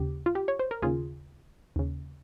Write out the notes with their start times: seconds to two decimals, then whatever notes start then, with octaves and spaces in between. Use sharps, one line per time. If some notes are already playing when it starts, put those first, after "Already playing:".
Already playing: D#2 C#3 G4
0.26 F4
0.35 G4
0.48 C#5
0.59 C5
0.71 A#4
0.82 D#2 C#3 F4 G#4
1.76 D#2 C#3